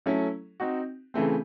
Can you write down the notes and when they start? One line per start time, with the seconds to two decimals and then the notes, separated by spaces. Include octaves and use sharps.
0.06 F#3 A3 C#4 E4 A4
0.60 C4 D#4 F#4
1.14 C#3 E3 A3 C4